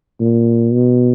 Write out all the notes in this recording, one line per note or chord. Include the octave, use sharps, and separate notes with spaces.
A#2
B2